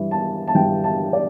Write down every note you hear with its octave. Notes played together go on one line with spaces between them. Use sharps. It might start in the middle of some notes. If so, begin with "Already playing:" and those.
Already playing: G2 E3 G3
A5
A5
G2 E3 G3 G5
A5
D5